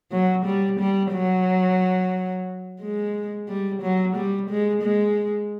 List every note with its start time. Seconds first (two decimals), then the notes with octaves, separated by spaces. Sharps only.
0.11 F#3
0.45 G3
0.79 G3
1.12 F#3
2.81 G#3
3.48 G3
3.82 F#3
4.16 G3
4.49 G#3
4.82 G#3